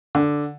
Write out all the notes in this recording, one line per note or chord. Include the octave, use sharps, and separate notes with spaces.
D3